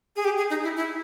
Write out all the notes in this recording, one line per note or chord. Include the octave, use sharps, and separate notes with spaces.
G#4
G4
G#4
D#4
E4
E4